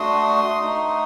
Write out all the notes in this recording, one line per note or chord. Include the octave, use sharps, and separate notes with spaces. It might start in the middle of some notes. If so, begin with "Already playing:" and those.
Already playing: A3 D4 F#4 C6 D#6
A3 D#4 F#4